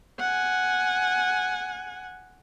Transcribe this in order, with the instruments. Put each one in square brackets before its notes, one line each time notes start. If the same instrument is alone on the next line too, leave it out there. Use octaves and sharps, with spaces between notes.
[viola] F#5 G#5